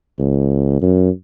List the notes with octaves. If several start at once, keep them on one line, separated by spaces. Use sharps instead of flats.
C#2
F#2